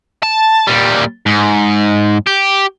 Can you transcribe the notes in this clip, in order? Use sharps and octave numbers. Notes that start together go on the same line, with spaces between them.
A5
A#2 G3
G#2
G4